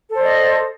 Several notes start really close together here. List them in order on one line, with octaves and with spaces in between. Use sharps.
A4 C5 D5 D#5